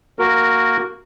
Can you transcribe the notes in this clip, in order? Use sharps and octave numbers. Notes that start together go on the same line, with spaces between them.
A#3 F#4 A#4